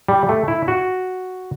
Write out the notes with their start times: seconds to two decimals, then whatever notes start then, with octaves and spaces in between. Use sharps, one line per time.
0.08 G3
0.29 A3
0.48 E4
0.68 F#4